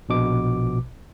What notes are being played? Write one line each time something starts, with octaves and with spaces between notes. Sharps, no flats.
A#1 B2 D6